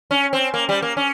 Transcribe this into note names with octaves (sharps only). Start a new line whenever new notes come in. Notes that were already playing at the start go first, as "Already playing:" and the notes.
C#4
C4
A#3
G3
A#3
C#4